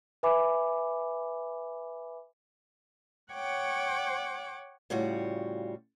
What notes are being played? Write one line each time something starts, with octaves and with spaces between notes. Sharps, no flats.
B4 E5 G#5 B5 D6
C#5 F#5 G5 D6
A2 C#3 G3 F4 F#4